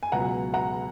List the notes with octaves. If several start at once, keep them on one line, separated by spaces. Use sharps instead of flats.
G#5
C#2 B2 F#3 F#5 A#5
F#5 A#5